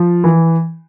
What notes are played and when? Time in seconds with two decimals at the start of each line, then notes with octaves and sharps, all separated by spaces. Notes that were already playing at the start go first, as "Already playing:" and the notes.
Already playing: F3
0.24 E3